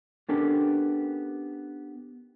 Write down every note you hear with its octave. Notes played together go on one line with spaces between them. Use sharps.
B3 C#4 D4 G4 A4 A#4